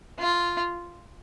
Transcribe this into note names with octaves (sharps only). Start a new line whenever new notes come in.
F4